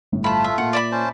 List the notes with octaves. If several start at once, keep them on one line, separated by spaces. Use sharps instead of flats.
G1 A2
A3 F4 A5 B5
E5
A#2 F#5
D5 E5 B5
C#4 C5 A5